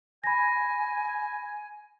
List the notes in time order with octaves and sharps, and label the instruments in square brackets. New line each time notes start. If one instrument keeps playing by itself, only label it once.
[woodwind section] G#5 [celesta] B5 A#6